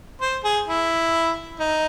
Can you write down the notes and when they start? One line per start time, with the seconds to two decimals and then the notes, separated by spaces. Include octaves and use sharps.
0.21 C5
0.44 G#4
0.68 E4
1.60 D#4